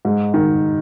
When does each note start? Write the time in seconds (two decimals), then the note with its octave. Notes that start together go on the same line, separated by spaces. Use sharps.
0.05 G#2
0.34 D#3